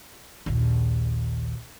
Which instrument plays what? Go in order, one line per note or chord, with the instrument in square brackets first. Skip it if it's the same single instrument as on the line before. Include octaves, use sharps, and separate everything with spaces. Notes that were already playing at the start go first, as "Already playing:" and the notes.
[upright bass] A#1 D#2